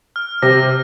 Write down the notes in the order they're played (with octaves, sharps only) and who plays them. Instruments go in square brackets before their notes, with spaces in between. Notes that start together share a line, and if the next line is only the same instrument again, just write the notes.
[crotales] F6
[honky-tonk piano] C3 [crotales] A#6